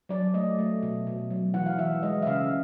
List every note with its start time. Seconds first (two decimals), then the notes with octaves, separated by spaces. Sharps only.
0.09 F#3 D5
0.34 A3 D#5
0.59 A3
0.83 B2
1.07 B2
1.30 F#3
1.54 E3 F#5
1.66 F5
1.78 E3 E5
2.03 G#3 D#5
2.22 E5
2.26 C#3 F5